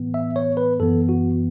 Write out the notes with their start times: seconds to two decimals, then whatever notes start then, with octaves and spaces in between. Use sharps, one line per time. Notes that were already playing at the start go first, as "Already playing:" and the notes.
Already playing: A2 E3 B3
0.14 E5
0.36 C#5
0.57 B4
0.79 F#2 E3 B3 A4
1.09 F#4